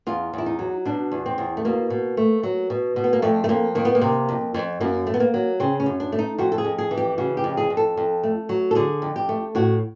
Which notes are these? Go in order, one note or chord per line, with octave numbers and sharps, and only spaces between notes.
E2 F4
E2 E4
D#4
F#3
B2 D4
E2
C4
E2
A3
B2 A#3
B2
A3
F#3
B2
B2
B3
A#3
F2 A3
A3
F2 A#3
D#3 A#3
B3
A#3
C3
F2
F2
F#2 A#3
A3
B3
A#3
F#3
C#3 C4
C#4
F#2
D4
A3
D#4
F2 F#4
A4
G#4
F2
G#4
E3
G4
C#3 F#4
G4
F2
G#4
F2
A4
F2
A3
F#3
A4
D3 G#4
F2
G4
A3
A2 F#4